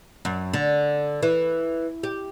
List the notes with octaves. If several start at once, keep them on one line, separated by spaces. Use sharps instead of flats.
F#2
D3
E3
G4